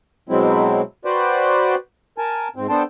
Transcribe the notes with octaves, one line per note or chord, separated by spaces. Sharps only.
B2 F#3 G#3 C4 E4
F#4 B4 C5 D5 G5
A#4 G#5 A5
G#2 C4
B3 D4 A4 C5 G5 A5